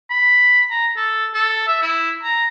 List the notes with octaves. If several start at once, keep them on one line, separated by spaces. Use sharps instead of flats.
B5
A#5
A4
A4
E5
E4
A#5